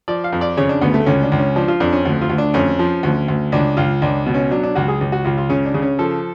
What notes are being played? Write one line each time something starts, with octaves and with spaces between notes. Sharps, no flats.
F3 D5
F5
F2
D5
C#3 C#5
D4
D2 B3
A3
C#2 C#4
D4
C#2
C#4
F3 D4
F4
F2 D4
C#4
D2
F4
D2
D4
F2 C#4
F3
D2
D2
C#2 D4
C#2 F4
C#2 D4
B2
C#4
F#3 D4
D4
C#2 F#4
G#4
C#2
F#4
C#2 F4
F4
C#3 C#4
D4
C#3
C#4
F3 A4